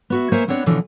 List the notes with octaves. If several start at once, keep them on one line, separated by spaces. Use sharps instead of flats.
B3 F#4 E5
A#3 C5 C#5 E5 G#5
B3 C4 D4 C#5 E5 F#5
B2 D3 E3 F3 C#4